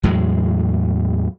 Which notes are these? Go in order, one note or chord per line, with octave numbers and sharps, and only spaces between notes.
E2 A2 F#3 G#3